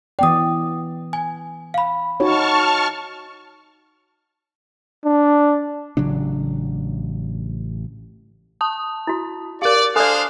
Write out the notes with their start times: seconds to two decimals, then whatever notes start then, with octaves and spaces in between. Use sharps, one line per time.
0.19 E3 B3 D5 G5 D#6
1.13 G#5
1.74 F5 B5
2.20 D#4 F#4 C#5 A5 C#6 F6
5.04 D4
5.97 A1 C#3 F#3 D4
8.61 A5 D#6
9.07 E4 F#4
9.62 G4 A#4 D5 F5
9.96 D4 A4 C5 D5 F5 G#5 D#6 F#6